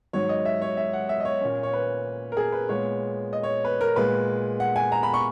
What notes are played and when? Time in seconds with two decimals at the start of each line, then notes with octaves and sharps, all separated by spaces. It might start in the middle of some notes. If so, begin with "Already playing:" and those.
0.13 G#2 D#3 F#3 C#5
0.29 D#5
0.45 E5
0.62 C#5
0.77 E5
0.93 F#5
1.09 E5
1.20 D#5
1.25 C#5
1.41 A#2 A#3 C#4
1.63 C#5
1.73 B4
2.32 A#4
2.37 G#4
2.52 B4
2.69 A#2 G#3 B3 C#5
3.33 D#5
3.43 C#5
3.65 B4
3.81 A#4
3.96 A#2 G#3 B3 B4
4.60 F#5
4.76 G#5
4.92 A#5
5.03 B5
5.14 C#6